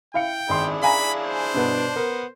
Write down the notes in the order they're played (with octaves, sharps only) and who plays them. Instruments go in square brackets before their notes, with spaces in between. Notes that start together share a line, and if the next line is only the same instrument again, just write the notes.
[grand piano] E4 F5 C#7 [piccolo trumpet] G5
[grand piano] G#1 C6 [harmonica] D4 E4 G#4
[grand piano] F5 G#5 A#5 [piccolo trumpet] B5
[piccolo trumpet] C5
[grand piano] G2 B2 B3
[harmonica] B3 [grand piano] A#4